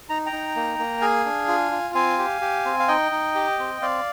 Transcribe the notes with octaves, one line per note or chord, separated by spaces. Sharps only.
D#4 A#5
G5 A#5
D#4
A#3
A#3
G#4 F5 G#5
D4
F4
F4
C4 F5 G#5
G4
G4
C4
F5
D#4 D#5 G5
D#4
G4
C4
C4 D5 F5